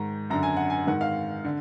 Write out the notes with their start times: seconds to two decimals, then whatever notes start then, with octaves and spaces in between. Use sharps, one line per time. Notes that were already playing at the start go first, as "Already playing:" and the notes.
Already playing: G#2 D#3 A#5
0.30 F#2 D3 A#5
0.43 G#5
0.57 F#5
0.70 G#5
0.87 G#2 D#3 F#5
1.01 F5
1.44 D3